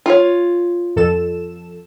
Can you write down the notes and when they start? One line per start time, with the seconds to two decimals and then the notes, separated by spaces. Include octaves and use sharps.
0.06 F4 C#5
0.96 F2 A4 E7